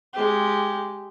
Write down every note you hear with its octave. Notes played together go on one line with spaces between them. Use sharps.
G#3 G4